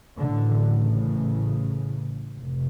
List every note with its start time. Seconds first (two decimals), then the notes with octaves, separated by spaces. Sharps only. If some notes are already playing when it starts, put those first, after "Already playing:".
0.19 A1 A2 D3
0.75 C#3
2.39 F1